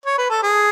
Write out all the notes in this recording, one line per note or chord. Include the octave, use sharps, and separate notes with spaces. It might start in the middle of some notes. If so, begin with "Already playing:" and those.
C#5
B4
A4
G#4